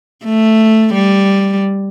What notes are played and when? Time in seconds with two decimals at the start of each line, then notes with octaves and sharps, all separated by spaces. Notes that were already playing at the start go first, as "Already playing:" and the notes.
0.25 A3
0.94 G3